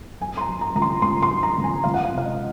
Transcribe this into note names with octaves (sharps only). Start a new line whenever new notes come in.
F#3 G#5
C6
A#5
F#3
A#5
C#2 A#5
C6
C#2 C6
C6
F#3
A#5
C#2
G#5
C#2 F5
F#5
F5
C3
F5
D#5